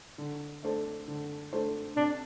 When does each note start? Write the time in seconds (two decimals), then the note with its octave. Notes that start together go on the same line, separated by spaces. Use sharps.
0.18 D3
0.63 A3 D4 A4 C5
1.08 D3
1.52 A3 D4 A4 C5
1.96 C3 D4